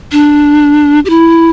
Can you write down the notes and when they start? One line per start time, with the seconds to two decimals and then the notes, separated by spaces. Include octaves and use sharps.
0.12 D4
1.05 G4
1.10 E4